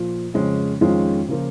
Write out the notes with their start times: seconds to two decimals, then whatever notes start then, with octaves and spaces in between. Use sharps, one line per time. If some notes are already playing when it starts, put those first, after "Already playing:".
Already playing: A#2 F3
0.34 F2 C#3 G#3 C#4
0.81 F2 D#3 G#3 C#4 F4
1.28 C#3 F3 A#3 F4